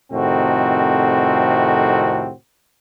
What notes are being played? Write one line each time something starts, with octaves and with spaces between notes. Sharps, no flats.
F2 A2 C3 D#3 C4 F#4